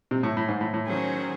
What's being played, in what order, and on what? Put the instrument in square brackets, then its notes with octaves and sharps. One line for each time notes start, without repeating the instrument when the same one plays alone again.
[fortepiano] C3
A2
A2
G#2
A2
A2
[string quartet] D#3 F#3 C#4 G#4 C5